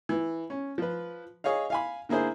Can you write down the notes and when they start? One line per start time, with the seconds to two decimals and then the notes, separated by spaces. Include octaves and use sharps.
0.09 E3
0.50 C#4
0.78 F3 B4
1.44 G#4 C#5 D#5 F5
1.70 F5 G#5 B5
2.09 D3 A#3 E4 G#4 C5